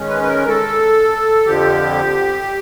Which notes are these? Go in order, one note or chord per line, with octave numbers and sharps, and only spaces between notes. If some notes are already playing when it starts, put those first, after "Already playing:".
Already playing: D#3 G#3 C#4
B4
B4
A#4
A4
F2 D3 F3 G4